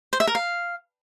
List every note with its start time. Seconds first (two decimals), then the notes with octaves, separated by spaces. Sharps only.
0.13 C5
0.20 E5
0.27 A#4
0.35 F5